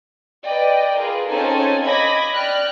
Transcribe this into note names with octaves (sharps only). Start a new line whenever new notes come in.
B4 D5 D#5 G5
F4 G#4 A#4 B4
C4 C#4 D#4 F4 A4 G#5
D#5 B5 D6 G#6 A#6
D5 G5 F6 F#6